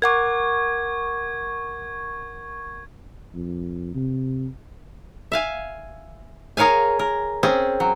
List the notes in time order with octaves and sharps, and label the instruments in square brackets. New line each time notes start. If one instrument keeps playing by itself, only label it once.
[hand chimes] A#4 F#5 D6 [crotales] C#6 G#6
[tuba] F2
C3
[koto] E5 F5 G#5
G#4 A#4 C#5 F5 G#5
A#4
C4 C#4 G#4
F#3